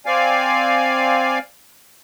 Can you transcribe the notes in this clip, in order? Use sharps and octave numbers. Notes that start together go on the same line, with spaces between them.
C4 D5 F5 G#5